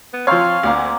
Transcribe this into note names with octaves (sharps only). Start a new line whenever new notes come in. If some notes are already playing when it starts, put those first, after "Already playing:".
B3
F3 C4 A#4 C#5 F5 C6
D2 A#3 D5 F#5